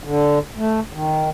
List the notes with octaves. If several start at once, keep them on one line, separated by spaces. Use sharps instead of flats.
D3
A3
D#3